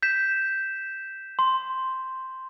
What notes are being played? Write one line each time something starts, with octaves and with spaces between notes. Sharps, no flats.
G6 B6 E7
C6